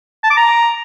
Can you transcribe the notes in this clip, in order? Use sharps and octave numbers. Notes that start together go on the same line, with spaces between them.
A5
D6
A#5